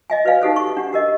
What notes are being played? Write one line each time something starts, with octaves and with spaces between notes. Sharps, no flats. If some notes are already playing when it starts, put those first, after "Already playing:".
D#5 E5 G#5
F#4 B4 D5 F5 G#5
D#4 G4 A4 C5
C#6
D4 F#5
G4 A#4 D#5